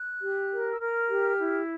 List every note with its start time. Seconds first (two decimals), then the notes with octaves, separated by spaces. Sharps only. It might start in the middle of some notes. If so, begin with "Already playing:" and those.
Already playing: F#6
0.22 G4
0.52 A#4
0.72 E6
0.80 A#4 F6
1.10 G4
1.39 E4